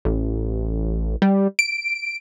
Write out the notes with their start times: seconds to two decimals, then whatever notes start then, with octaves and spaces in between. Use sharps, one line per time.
0.05 A1
1.22 G3
1.59 D7